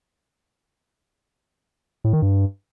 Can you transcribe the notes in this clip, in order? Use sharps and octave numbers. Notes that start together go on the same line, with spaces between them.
A2
D#3
G2